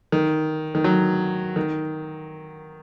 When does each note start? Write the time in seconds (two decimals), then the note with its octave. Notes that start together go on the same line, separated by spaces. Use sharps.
0.12 D#3
0.75 D#3
0.84 F#3
1.56 D#3